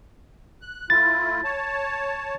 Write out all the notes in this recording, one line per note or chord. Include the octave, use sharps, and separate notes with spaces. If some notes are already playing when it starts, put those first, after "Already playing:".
F#6
A3 E4 F4 A6
C#5 A5